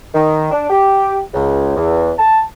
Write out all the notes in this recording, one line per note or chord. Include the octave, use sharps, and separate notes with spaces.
D#3
D4
G4
C#2
E2
A5